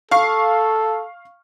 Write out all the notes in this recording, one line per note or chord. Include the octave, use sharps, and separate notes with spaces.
A4 F5 C#6 C7